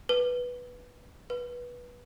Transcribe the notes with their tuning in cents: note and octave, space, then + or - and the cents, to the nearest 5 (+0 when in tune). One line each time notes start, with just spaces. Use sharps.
B4 -5
B4 -20